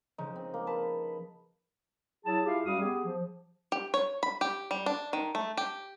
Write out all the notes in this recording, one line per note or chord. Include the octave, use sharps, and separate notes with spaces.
C#3 F3 D#4
C4
A#3
B4 A5
F#3 E4 G#4 A5
E4 F4 G4 G#4 F5
F#2 G3 F#4 F5 D#6
B3 G4 G#4
F3
G4
C#5
B5
G4
G3
D4
D#3
A3
G4